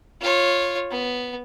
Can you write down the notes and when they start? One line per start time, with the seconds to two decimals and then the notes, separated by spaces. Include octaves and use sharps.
0.21 F4 C#5
0.91 B3